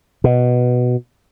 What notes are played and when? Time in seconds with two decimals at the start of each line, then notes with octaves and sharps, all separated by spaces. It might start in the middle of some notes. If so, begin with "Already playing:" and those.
0.24 B2